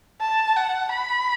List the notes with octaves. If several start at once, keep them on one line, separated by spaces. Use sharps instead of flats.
A5
F#5
B5